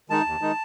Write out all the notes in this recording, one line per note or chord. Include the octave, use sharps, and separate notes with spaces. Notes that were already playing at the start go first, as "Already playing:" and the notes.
D#3 G#3 D#4 A5
D#2
D#3 G#3 D#4